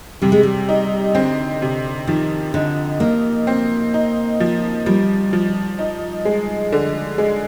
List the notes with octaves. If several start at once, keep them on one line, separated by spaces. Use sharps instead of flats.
C3 G3
G#3
G3
D#4
D3 C4
C3
D#3 F3
D3 D#4
A#3 D#4
C4
D#4
F3
F3 G3
F3
D#4
G#3
D3
G#3